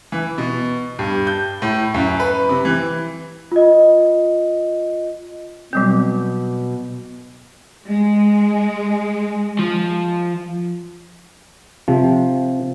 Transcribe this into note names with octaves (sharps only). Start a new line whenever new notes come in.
E3
B2
G2
G6
A2
F#2
B4
C3
E3
F4 D#5
B2 F#3 G3 C4
G#3
F3
C3 F3